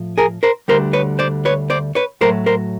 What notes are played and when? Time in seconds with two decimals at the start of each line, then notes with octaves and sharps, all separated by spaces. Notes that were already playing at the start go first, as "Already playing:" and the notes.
Already playing: A2 F3
0.18 G#4 A#4
0.43 A#4 C5
0.68 D2 D3 G3 A#4 C5
0.93 B4 C#5
1.19 C5 D5
1.45 B4 C#5
1.70 C5 D5
1.95 B4 C#5
2.21 A2 F#3 A3 A#4 C5
2.46 A#4 C5